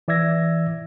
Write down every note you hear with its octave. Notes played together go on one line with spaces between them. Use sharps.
E3 D5 E5 E6 G#6 A#6